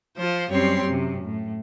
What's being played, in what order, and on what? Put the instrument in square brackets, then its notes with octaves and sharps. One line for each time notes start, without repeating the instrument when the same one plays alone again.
[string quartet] F3 F4 C5
F#2 G3 C4 G4 C#5 C6
F#2 C3
A2